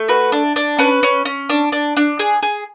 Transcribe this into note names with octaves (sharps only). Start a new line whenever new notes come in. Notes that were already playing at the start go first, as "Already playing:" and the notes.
Already playing: A3
F#4 B4
D4
D4
C#4 B4
C#4
C#4
D4
D4
D4
G#4
G#4